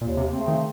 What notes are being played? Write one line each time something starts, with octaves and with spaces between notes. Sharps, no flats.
D#2 A#2
C3
C#3 A3 C4
D#3